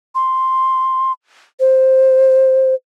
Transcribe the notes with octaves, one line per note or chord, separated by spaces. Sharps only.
C6
C5